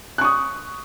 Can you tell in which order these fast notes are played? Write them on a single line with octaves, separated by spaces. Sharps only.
F#6 C#6 D#6